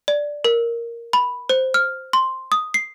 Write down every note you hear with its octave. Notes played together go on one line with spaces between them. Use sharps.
D5
A#4
B5
C5
F6
C6
D#6
C7